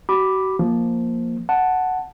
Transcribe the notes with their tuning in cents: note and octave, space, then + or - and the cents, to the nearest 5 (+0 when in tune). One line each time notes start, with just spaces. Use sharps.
F#4 +40 B5 +0 D6 +0
F3 +0 A#3 +0
F#5 +0 A5 +0